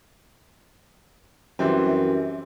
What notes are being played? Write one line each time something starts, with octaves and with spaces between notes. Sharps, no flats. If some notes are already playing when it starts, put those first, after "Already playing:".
F#2 E3 G3 C4